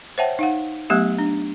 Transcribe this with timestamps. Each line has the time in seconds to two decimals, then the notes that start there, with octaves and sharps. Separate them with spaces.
0.18 C5 C#5 E5 F#5 G5 A5
0.39 D#4 F5 F#5
0.90 F#3 A3 B3 G4 E5
1.18 D4